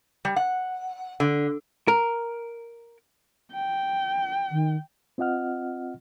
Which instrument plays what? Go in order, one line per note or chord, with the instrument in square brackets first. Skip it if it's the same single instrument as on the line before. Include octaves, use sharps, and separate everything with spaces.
[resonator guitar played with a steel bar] G3
F#5
D3
[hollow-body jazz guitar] A#4
[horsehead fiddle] G5
[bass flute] D#3
[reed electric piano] C4 F4 D#5 F#5 F6